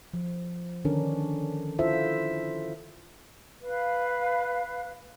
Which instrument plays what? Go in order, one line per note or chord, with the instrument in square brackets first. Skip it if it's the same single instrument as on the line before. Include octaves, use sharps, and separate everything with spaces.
[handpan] F3
D3 D#3 C#4 D4 A#4
E4 F4 A4 C5 E5
[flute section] B4 F5